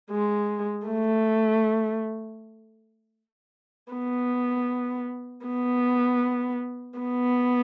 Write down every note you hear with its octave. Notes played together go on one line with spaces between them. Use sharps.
G#3
A3
B3
B3
B3